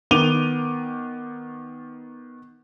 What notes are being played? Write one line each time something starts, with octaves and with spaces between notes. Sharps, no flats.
D#3 B3 D6 D#7 F7 G7